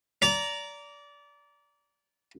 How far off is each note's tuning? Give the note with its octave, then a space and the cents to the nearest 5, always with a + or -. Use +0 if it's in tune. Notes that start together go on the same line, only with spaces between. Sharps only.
D5 -25 A#5 +0